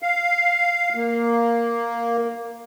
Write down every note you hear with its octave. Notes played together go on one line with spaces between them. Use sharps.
F5
A#3